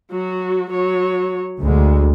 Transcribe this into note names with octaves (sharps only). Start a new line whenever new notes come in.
F#3 F#4
F#3 C#5
D2 G#3